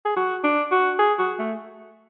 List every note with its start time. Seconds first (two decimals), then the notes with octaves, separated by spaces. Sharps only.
0.05 G#4
0.16 F#4
0.44 D4
0.72 F#4
0.99 G#4
1.19 F#4
1.39 A3